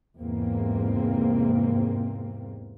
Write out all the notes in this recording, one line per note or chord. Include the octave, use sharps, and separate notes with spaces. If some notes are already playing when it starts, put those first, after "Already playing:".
E2 G#2 C3 A#3 C4